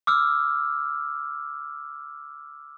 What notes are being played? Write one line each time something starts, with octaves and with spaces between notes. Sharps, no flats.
D6 E6 F6